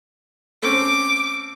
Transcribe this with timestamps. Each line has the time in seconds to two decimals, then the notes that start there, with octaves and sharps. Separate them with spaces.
0.63 A3 C4 C#4 D6